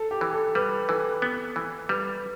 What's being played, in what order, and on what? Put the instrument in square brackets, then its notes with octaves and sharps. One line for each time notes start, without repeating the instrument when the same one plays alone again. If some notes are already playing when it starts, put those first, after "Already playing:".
Already playing: [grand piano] A4
G4
[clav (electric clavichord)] E3
[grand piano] A4
[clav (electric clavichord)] G3 [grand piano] B4
[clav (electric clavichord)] E3 [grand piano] A4
[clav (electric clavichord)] B3
E3
[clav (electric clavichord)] G3 [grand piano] B4